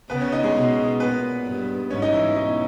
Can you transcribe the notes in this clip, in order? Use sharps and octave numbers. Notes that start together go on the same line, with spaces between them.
C#3 B3 B4
C#4 C#5
D#4 D#5
G#3 G#4
B2
A#2 B3 B4
G2
G#2 C#4 C#5
D#4 D#5
E3 E4
C#4
B2 D#4